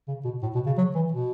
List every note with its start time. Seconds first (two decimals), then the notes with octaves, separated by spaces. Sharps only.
0.08 C#3
0.25 B2
0.43 A2
0.55 B2
0.67 C#3
0.78 F#3
0.95 E3
1.12 B2